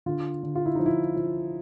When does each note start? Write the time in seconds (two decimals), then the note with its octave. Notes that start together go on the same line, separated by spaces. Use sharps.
0.06 D3 F4
0.43 D3
0.55 F4
0.66 E4
0.75 F3 D#4
0.86 E4
1.16 F3